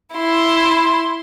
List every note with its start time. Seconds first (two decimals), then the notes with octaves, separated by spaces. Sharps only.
0.15 E4 C6